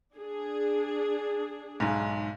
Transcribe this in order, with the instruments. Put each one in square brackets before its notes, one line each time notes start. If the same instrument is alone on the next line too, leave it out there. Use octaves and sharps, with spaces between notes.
[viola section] D4 G#4
[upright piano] B1 G#2